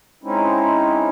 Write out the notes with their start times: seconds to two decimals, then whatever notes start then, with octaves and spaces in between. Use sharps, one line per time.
0.24 G#3 C4 C#4 D#4 E4